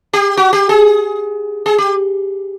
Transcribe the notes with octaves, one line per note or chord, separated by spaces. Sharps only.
G4
F#4
G4
G#4
G#4
G4